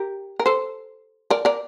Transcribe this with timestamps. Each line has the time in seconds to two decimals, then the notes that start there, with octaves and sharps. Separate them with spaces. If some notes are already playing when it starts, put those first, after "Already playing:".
Already playing: G4 A#4
0.39 A#4
0.46 A4 C5
1.30 A#4 D5
1.45 A#4 D5